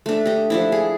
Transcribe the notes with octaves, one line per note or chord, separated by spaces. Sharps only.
A3 D4
G4 D#5
F3 D4 E4
G#4